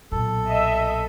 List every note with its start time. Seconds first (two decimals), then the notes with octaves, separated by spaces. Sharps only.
0.12 B1 A#2 A4
0.47 D#5 E5